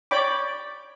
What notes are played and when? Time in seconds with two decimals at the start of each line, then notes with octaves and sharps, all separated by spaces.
0.11 C#5 D5 G5 B5 D6